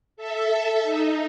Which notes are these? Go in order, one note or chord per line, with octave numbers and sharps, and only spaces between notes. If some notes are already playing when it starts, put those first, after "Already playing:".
A4 E5
D#4